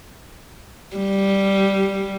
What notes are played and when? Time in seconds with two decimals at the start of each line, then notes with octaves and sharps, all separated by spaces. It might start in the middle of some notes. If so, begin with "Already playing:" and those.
0.97 G3